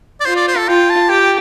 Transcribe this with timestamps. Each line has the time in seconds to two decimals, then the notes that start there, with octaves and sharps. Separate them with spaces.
0.20 D5
0.26 F4 C5
0.36 D5
0.48 C5
0.57 A4
0.68 F4 G5
0.90 A5
1.09 G4 G5